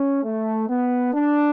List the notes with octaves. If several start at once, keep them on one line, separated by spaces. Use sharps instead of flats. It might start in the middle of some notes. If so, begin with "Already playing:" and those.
Already playing: C#4
A3
B3
D4